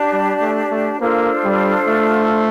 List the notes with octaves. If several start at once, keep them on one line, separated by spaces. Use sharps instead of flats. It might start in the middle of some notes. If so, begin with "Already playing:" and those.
Already playing: D4 G4 D5 A5
G3
A3
A3
A#3 D4 F4 A4 C5
G3
A3